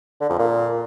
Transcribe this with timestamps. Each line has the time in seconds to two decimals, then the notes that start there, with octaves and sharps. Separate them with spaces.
0.21 D3
0.30 F2
0.39 A#2